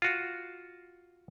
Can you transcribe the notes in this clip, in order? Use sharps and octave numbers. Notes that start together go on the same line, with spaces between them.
F4 F#4